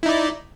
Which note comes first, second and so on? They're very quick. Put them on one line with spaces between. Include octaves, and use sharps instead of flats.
E4 D#4 D5